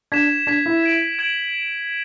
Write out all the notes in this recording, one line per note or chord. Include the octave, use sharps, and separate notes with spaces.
D4 G#6 B6 E7
D4 G#6 B6 E7
E4
G#6 D7 F#7
G#6 D7 F#7